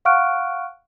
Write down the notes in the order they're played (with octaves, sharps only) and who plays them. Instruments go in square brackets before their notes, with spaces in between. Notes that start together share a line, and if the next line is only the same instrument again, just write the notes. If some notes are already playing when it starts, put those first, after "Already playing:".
[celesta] F5 F#5 C#6 F6 F#6 D7